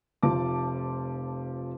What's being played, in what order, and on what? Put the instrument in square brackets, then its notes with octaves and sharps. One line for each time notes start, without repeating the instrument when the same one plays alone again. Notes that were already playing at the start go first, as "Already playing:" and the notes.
[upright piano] F1 F3 A5 D6